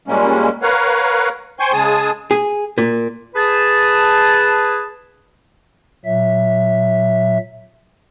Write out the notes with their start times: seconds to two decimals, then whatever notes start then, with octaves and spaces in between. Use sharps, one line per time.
0.08 A#2 G3 G#3 A#3 C#4
0.62 A#4 B4 C#5 F5 F#5
1.60 C5 G5 G#5 C6 C#6
1.73 C#3 G#3 G#4 G#5 A5 D#6
2.31 G#4
2.78 A#2
3.35 G#4 B4 A5
6.05 A#2 F#3 E5